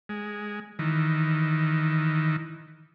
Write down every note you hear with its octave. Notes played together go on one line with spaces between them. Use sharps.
G#3
D#3 E3